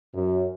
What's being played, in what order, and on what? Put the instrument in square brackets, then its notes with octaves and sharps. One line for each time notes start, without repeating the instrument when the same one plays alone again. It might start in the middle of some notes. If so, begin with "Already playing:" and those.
[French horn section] F#2